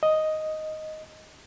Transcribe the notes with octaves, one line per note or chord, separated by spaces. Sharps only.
D#5